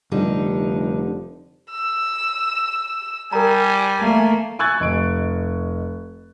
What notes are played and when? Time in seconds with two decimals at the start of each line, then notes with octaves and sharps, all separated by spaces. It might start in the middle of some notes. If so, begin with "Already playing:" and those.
0.11 F1 D3 G3 D#4
1.71 E6
3.32 G3 A#4 G#5 A#5
4.00 A3 A#3
4.59 G#5 C#6 E6 F#6 G#6 A6
4.80 F1 D#5 C#6 D7